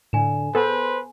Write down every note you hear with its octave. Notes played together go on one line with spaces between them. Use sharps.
A2 D3 G#5 E7
B3 G#4 A4 B4 C5